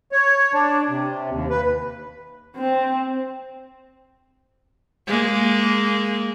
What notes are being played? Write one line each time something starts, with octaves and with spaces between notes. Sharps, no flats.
C#5
D4
C3
D#2
B4
C4
G#3 A#3